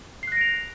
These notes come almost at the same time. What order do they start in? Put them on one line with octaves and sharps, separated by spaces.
C7 F#6 A#6 D7 F7